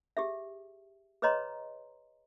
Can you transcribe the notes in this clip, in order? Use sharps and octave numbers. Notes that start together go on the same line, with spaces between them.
G4 G#4 E5
G#4 B4 C#5 D#5 A#5 C6